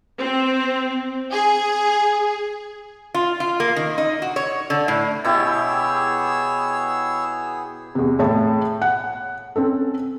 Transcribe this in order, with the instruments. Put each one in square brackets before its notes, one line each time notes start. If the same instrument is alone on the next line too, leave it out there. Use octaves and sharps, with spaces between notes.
[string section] C4
G#4
[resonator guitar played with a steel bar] F4
F4
A#3
D#3
D#4
F#4
C#5
D3
A2
[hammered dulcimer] B2 E4 G4 [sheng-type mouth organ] B3 G#4 [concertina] C#5 E6
[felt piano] E2 C3
A2 G#4 C#5 A5
F#5
C4 C#4 A4